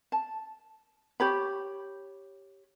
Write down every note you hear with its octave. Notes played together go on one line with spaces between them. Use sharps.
A5
G4 C#5 B5